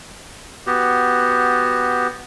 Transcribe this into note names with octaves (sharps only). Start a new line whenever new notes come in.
B3 F#4 G4